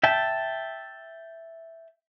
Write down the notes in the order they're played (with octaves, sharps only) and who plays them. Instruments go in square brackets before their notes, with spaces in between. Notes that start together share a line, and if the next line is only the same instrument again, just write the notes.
[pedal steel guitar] E5 G5 A5